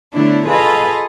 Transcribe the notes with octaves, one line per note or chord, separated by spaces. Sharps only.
D3 A3 B3 D4 E4 C#5
F4 G#4 A4 B4 D#5 F5